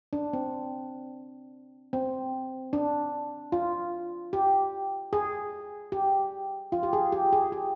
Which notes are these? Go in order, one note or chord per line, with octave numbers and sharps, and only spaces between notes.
D4
C4
C4
D4
F4
G4
G#4
G4
F4
G4
G#4
G4
G#4
G4